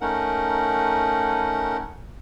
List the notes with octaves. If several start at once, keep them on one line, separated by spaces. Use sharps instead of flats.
A3 C#4 D#4 A#4 F#5